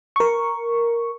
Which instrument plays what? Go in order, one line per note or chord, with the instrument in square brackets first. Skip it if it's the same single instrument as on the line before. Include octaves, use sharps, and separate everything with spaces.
[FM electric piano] A#4 C#6